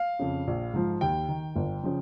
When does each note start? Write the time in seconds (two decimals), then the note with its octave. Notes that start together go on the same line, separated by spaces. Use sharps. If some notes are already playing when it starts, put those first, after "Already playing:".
Already playing: F5
0.19 F2 C#3
0.47 A#1
0.73 G#2 F3
1.01 D#2 G5
1.28 D#3
1.56 G1
1.83 C#3 F3